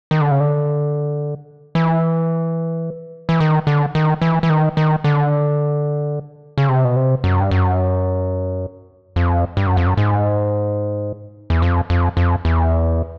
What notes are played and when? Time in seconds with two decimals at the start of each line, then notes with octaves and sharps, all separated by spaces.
0.11 D#3
0.21 D3
0.31 C#3
0.40 D3
1.75 E3
3.29 E3
3.40 D#3
3.67 D3
3.95 D#3
4.22 E3
4.43 E3
4.50 D#3
4.77 D#3
5.04 D3
6.58 C#3
6.69 C3
6.84 B2
6.96 C3
7.24 F#2
7.40 G2
7.51 F#2
9.16 F2
9.57 G2
9.67 F#2
9.77 F2
9.86 F#2
9.97 G#2
11.50 E2
11.62 F2
11.90 F2
12.17 F2
12.45 E2